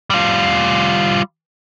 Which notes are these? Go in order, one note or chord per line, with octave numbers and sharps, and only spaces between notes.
G3 F4